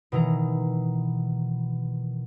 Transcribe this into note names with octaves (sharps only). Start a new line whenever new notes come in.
B2 D#3 E3 A#5